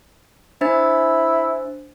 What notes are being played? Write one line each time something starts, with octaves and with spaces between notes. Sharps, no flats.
D4 E4 C5 A6